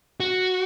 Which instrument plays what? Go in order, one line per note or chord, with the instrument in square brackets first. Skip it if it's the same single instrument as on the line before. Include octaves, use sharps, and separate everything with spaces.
[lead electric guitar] F#4